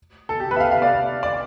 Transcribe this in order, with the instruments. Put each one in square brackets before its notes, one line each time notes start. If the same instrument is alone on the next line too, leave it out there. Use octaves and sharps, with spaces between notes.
[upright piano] A4
G4
B4
E5
F5
F5
D5
D5